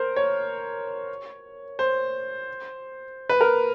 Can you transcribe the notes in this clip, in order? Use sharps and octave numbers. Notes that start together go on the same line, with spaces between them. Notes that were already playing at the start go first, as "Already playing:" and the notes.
Already playing: A#4 C5
C#5
C5
B4
A#4